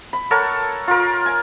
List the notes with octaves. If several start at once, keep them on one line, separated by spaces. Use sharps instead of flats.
B5
A4 A#4 C#5 F#5
F4 A#4
G#5